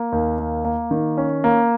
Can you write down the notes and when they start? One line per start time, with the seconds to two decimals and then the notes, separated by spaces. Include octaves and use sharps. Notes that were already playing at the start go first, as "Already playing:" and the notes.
Already playing: A#3
0.12 D#2
0.38 A#3
0.65 A#3
0.91 D#3
1.17 C#4
1.44 A#3